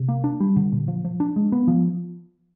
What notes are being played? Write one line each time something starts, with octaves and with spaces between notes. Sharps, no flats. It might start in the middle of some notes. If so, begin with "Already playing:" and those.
Already playing: C3
A#3
D4
G3
D3
A#2
F3
F3
D4
G#3
B3
F3